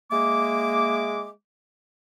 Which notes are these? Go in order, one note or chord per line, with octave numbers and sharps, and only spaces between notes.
G#3 A#3 E5 D6